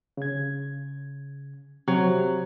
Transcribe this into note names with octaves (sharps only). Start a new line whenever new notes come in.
C#3 G#6
C3 F#3